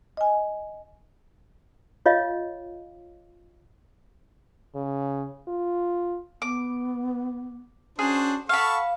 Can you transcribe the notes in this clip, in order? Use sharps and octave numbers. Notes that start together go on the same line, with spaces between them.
D#5 G#5
F4 C#5 D#5 F5
C#3
F4
B3 D6
C#4 D4 F#4 G#4 C5
A4 F5 F#5 A5 B5 C#6